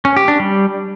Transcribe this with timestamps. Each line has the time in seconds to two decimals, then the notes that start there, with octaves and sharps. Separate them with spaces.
0.05 C#4
0.16 G4
0.28 D4
0.40 G3